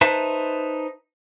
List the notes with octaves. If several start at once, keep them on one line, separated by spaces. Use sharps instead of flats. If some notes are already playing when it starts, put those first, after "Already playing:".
D#4 B4 C5 E5 A5